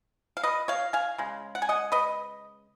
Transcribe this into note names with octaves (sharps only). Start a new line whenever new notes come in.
F5
B4 D#5
C#5 F5
F5 G#5
C#3 G#3
F#5
G#5
D#5 F#5
B4 D#5